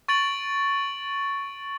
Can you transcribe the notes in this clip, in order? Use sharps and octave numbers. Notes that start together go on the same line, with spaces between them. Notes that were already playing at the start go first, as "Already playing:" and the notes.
C#6 A6 D7 F#7